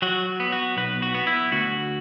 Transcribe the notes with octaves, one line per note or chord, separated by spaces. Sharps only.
F#3 F#4
B3
F#4
B1 B4
F#4
B3
E4
D2 F#4